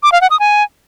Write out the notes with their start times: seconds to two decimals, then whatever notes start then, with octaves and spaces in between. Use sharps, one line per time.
0.03 D6
0.12 F5
0.21 F#5
0.30 D#6
0.40 G#5